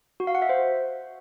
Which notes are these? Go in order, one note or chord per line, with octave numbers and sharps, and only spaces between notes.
F#4
F5
F#5
E5
C5